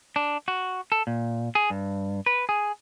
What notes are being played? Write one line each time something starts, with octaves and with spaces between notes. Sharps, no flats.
D4
F#4
A4
A#2
G#4
G2
B4
G#4